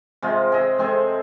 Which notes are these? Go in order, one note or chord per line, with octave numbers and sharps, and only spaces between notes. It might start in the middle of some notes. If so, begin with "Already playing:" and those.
C3 G#3 F4 D#5
G#4 D#5 E5
G#3 C4 G#4 A4